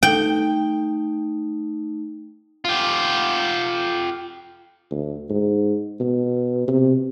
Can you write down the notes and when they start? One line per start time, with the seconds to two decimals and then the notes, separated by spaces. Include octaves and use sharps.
0.03 A3 D#4 G5
2.65 F4 G4
4.91 D2
5.30 G#2
6.00 B2
6.68 C3